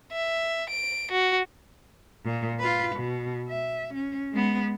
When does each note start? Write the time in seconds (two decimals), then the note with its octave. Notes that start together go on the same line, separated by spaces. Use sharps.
0.12 E5
0.69 D7
1.11 F#4
2.25 A#2
2.60 F4 B4
2.96 B2
3.48 E5
3.94 C#4
4.33 G#3 B3